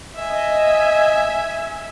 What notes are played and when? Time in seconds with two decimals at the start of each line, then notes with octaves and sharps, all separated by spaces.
0.16 D#5 E5 G#5